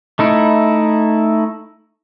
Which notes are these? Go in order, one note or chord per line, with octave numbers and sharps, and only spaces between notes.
A3 D#4 E4